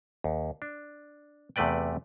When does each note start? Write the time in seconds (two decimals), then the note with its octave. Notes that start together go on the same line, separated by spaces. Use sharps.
0.24 D#2
0.62 D4
1.56 E2 C3 A3 B4 D5 G5